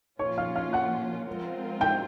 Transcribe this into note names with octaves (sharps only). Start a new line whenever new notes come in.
A#2 F3 A#3 C#4 F4 C#5 C#6
F5 F6
F5 F6
F#5 F#6
F3 G#3 C4 F4 A#4
G5 G6